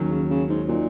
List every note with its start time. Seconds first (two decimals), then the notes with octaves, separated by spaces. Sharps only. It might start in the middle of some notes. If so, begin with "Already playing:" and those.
Already playing: D#2 D#3 F#3 C#4
0.10 C#3
0.30 C#3
0.49 G#2
0.68 A#2 F#3 D#4